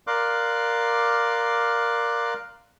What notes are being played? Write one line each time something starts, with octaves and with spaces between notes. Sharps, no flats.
A#4 D5 F5 C6 D6 F#6